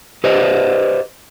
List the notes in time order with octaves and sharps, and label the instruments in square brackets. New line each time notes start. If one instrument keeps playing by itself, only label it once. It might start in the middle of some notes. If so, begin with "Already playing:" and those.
[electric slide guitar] G4 B4 C5 D5 D#5